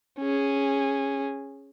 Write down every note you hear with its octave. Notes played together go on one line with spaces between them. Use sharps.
C#4 G#4